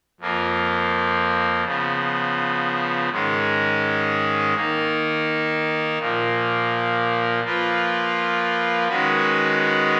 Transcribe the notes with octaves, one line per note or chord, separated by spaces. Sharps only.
F2 F3 A#3
C#3 F3 B3
G#2 D#3 G#3 C#4
D#3 A#3 D#4
A#2 F3 A#3
F3 A#3 F4 B4
D#3 G#3 C#4 F#4 B4